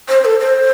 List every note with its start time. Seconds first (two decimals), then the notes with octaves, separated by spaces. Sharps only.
0.09 C5
0.25 A4
0.40 C5